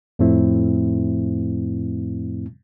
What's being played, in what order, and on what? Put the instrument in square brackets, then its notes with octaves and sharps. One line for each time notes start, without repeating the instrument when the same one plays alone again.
[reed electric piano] F2 A2 F3 A3 C4 E4